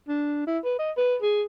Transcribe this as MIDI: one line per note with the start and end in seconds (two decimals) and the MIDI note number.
0.08 0.44 62
0.47 0.58 64
0.64 0.76 71
0.79 0.91 75
0.97 1.16 71
1.22 1.43 68